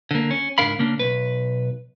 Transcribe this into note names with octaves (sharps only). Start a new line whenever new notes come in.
D3 A#3
C#4
C#2 G#2 D4 A#4 F5 B5
C#3 A#3 C#4 D4
B1 B4